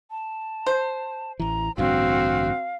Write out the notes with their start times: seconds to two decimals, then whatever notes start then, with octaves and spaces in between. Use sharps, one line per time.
0.11 A5
0.66 C5
1.40 A1 E3 A#5
1.78 A1 G2 D3 C4 F#4 F5